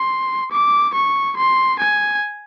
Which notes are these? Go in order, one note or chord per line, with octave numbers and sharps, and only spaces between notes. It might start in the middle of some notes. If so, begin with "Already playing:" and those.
Already playing: C6
D6
C#6
C6
G#5